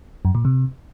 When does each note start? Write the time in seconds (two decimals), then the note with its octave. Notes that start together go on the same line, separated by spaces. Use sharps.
0.25 F#2
0.35 A#2
0.45 C3